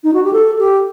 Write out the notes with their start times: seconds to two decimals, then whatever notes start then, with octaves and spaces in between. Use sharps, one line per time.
0.04 D#4
0.14 F#4
0.24 G4
0.33 A4
0.59 G4